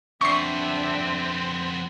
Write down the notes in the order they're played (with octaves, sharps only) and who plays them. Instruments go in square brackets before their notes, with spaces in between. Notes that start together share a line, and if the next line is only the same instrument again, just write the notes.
[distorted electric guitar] F2 B3 [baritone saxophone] C4 [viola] D4 E5 [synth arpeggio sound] C#6 C7